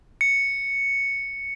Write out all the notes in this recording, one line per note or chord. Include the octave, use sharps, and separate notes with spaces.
C#7